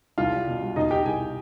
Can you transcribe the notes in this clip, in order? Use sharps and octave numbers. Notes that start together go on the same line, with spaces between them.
C2 F4 F5
G3
B2
G3
B2 D#4 D#5
B2 G4 G5
C2 G#4 G#5